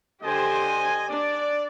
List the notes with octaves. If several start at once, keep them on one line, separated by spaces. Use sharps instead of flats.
D3 G4 C5 D#5 G#5
D4 D5